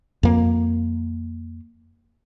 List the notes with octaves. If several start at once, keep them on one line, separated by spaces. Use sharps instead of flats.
F2 A#3